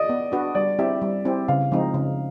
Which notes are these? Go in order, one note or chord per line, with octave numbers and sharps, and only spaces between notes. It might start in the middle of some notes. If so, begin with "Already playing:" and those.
Already playing: D5 D#5
B3
D4 F#4 B4
G3 D5
C4 E4 G4 E5
G3
C4 E4 G4
C#3 F5
F3 G#3 C4 D#4
C#3